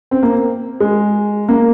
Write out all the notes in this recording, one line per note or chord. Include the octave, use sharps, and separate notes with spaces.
C4
A#3
G#3
A#3